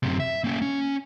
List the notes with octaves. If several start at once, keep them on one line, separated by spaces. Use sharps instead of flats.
F#2 C3
E5
A#3 C#4
C#4